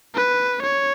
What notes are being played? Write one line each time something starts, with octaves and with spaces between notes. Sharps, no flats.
B4
C#5